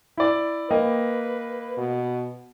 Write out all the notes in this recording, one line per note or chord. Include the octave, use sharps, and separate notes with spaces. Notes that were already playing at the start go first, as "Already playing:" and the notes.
E4 D5
A#3 B4 D#5 G5
B2